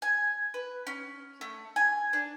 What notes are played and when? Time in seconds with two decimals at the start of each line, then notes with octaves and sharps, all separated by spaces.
0.02 G#5
0.54 B4
0.87 C#4
1.41 A3
1.76 G#5
2.13 D4